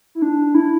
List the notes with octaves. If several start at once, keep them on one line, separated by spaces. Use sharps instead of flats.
E4
D4
E4